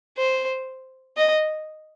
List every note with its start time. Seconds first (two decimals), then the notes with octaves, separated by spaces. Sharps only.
0.18 C5
1.17 D#5